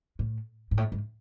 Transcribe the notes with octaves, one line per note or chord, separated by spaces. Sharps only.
A2
G#2
A2
G#2